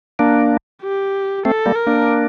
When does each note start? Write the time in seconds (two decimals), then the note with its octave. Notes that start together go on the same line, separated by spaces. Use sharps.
0.19 A#3 D4
0.83 G4
1.45 A3 C4 A4
1.66 G3 A#3
1.76 A#4
1.87 A#3 D4